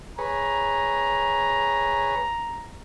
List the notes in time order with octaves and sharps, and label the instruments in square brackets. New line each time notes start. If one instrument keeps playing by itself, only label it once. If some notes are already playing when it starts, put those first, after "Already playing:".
[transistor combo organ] G#4 B4 C#5 [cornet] A#5